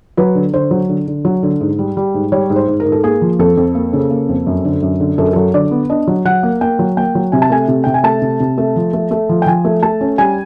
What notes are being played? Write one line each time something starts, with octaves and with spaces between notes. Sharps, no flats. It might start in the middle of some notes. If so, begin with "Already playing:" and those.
F#3 B4
D3
D3 C5
F#3
D3
D3
F#3
D3
G#2
G3
G3
G#2
G3 C#5
G#2
C5
G#2
A#4
G#2
A4
A#3 G#4
F3
F2 A4
F2
A#3
C#3
A#3
F2
F#2
D3
F#2
D3
F#2 A4
A#4
F#3 A4
D3 D5
B3
D4 D#5
F#3
F#3 F#5
A#3
A#3 G5
F#3
A#3 G5
F#3
C3 G#5
A5
A3 G#5
C3
C3 G5
G#5
A3 A5
C3
C3
A3
F3
A3
A3
F3
G5
F3 G#5
A3
A3 A5
C#4
G3 G#5